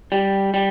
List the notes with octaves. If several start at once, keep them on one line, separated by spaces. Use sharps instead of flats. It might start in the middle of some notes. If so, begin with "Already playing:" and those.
G3
G3